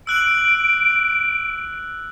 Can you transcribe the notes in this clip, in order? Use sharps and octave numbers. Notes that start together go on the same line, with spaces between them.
E6 F#6 D7 F#7